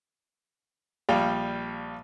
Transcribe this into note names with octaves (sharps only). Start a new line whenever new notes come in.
A#1 G3 F5 G5